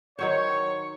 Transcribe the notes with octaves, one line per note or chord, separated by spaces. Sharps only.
D#3 F#3 C5 C#5